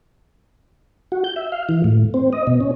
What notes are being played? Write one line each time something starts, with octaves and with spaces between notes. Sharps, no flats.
F#4
G6
E5
F5
E3
A2
C4
D#5
B2
C#4